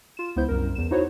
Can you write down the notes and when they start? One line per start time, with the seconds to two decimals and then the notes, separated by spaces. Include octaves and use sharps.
0.17 F4 E7
0.36 C#2 B3 E4 C5 G6
0.48 C2 F#2 A#4
0.75 E2 E7
0.91 D#4 E4 F#4 C5 C#5